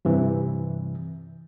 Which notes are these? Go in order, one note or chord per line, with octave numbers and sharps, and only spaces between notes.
G2 C3 E3